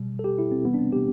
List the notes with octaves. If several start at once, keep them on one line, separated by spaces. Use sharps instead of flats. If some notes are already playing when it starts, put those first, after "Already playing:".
Already playing: B2 G3
A4
G4
E4
C4
C3 E3 G3 B3
D4
C4
G4